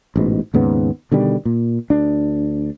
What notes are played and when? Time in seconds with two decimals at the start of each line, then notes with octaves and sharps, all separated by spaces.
0.16 A1 G#2 B2
0.54 D#2 G#2 C#3 B3
1.12 B2 D3 D#3 G3
1.45 A#2
1.90 D2 D4